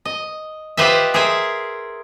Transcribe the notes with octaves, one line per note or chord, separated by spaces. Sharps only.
D#5
F4 G4 B4 C5 D#5 E5
G#4 A#4 C5 E5 G#5